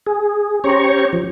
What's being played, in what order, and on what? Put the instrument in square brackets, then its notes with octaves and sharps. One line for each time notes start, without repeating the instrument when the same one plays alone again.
[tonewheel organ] G#4
C#4 G4 C5 C#5 A#5 C#6
F3